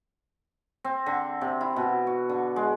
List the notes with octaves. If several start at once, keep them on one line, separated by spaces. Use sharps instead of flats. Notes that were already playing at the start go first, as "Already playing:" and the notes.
C4
D3
C3
E4
B2
F#4
D3
G#3